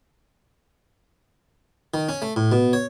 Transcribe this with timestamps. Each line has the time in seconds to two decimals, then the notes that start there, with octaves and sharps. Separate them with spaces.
1.94 D#3
2.09 C#4
2.22 A3
2.36 A2
2.52 B2
2.73 C#5